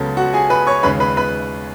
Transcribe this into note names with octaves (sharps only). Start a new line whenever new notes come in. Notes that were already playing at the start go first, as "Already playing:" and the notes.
Already playing: C#2 C#3 F#3 B3 A4
F#4 F#5
G#4 G#5
B4 B5
C#5 C#6
D#2 C#3 G#3 B4 B5
B4 B5
B4 B5